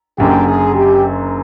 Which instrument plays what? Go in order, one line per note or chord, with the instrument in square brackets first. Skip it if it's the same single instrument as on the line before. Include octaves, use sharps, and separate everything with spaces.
[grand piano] F#1 F#2 D3 [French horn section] G4
[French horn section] G#4
G4